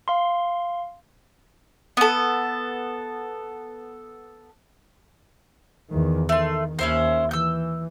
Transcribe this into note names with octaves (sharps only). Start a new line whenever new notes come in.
F5 C6
B3 A4
E2 D#3
D#3 A3 C6
D#2 C#4 E4 C5
E3 E6 G6